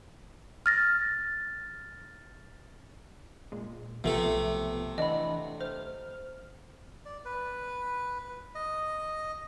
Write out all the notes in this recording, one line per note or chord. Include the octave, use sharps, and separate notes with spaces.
F6 A6 A#6
A#2 G#3
B1 C3 F3 A3 B3 A4
E3 D4 D#5 F#5 B5
C5 F6
D5
B4
D#5